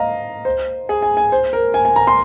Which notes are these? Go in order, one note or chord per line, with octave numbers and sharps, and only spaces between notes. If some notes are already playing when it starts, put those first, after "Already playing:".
Already playing: D#5 F5 A#5
C5
G#4
G#5
G#5
C5
A#4
G#5
G#5
A#5
C6